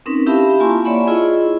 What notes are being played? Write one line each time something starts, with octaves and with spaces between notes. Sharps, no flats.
C4 C#4 D#4 A#4 B4
E4 G4 E5 F5 A5 B5
A#3 F4 G#5 A5 C6 C#6
C#5 D5 E5 F#5 B5 C#6
E4 F4 G#4 D#5